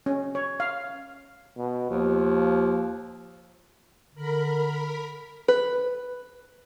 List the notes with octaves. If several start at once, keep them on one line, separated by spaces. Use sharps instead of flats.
C#4
C#5
F5
B2
D#2 F3
D3 A#4 B5
B4